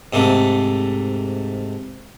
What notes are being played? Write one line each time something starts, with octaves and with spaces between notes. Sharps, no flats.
G#2 C3 A3